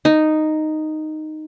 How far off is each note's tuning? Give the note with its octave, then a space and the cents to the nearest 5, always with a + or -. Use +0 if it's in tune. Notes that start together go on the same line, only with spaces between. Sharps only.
D#4 -5